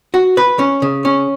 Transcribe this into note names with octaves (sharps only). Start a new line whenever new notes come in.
F#4
B4
C#4
C#3
C#4